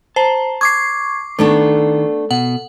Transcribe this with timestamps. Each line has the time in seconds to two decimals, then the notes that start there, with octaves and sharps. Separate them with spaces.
0.16 C5 A5 A#5
0.61 C#6 D6 G#6 C7
1.39 D#3 A3 B3 D4 A4
2.31 B2 F#5